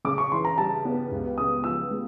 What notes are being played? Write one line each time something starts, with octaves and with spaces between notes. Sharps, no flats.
C#3 D6
C#6
E3 C6
A#5
G3 A5
B3
C#2
C#3 D#6
F3 E6
G#3